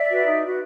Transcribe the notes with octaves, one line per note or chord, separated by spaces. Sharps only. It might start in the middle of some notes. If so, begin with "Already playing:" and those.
Already playing: D5 E5
F#4 B4
D#4
F#4 B4